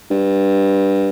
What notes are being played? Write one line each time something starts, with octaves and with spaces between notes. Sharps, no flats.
G2